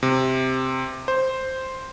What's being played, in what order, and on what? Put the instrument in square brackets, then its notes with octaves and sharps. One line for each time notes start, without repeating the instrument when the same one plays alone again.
[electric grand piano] C3
C5